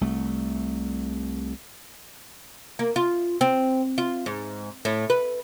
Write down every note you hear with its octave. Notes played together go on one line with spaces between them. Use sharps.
C2 A3
A#3
F4
C4
F4
G#2
A2
B4